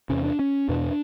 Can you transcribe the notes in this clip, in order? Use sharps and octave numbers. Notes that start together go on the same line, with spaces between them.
E2 C3 C#4
D4
C#4
E2 B2 D4